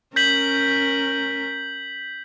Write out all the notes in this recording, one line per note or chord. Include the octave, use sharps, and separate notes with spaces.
C#4 A#4 G6 B6 F#7